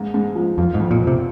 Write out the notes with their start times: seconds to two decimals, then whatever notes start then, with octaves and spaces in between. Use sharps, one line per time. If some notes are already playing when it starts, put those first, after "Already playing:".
Already playing: G#2 A#3
0.14 G#2
0.35 F3
0.58 F2 F4
0.74 G#2
0.80 F2
0.91 A#2
1.02 F3
1.07 C3